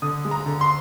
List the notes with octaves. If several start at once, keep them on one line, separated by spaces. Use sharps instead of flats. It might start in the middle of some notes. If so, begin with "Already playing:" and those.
D3 D#6
G#3
A#5
D3
C6